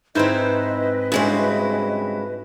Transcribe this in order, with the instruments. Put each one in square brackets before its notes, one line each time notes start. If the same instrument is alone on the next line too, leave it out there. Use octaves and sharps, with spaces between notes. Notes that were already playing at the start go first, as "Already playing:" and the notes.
[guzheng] G#2 C4 [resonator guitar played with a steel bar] D#4 E4 C5 [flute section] B4 D#5
[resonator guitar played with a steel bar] G2 C4 [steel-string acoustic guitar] C#3 G#3 E4 [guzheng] F#4